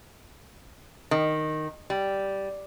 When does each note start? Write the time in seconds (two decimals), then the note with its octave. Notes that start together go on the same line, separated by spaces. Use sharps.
1.11 D#3
1.90 G3